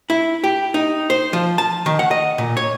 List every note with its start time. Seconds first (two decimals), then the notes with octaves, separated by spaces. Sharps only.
0.10 E4
0.44 G4
0.74 D#4
1.10 C5
1.33 F3
1.58 A5
1.86 D#3
1.99 F#5
2.11 D#5
2.38 A#2
2.57 C#5